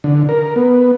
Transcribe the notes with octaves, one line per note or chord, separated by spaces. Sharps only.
D3
A#4
B3